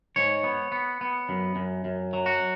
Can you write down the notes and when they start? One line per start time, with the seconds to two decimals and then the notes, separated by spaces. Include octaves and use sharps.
0.16 G#2 C#5
0.44 B3
0.72 B3
1.01 B3
1.29 F#2
1.56 F#2
1.85 F#2
2.13 F#3
2.26 F#4